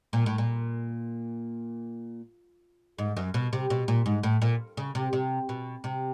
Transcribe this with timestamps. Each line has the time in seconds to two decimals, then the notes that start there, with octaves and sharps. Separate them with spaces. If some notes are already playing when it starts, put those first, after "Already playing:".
0.13 A#2
0.26 A2
0.38 A#2
2.99 G#2
3.17 F#2
3.34 B2
3.53 C3
3.70 B2
3.88 A#2
4.06 G#2
4.23 A2
4.42 A#2
4.77 C#3
4.95 C3
5.13 C3
5.49 B2
5.84 C3